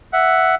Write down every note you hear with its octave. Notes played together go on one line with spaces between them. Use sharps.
E5 F#5